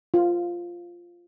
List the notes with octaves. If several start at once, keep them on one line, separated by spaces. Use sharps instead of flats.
F4